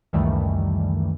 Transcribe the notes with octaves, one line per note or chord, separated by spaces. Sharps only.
C#2 F#2 D#3 E3 G3 A3